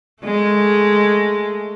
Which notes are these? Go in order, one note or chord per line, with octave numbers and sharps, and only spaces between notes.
G#3 A3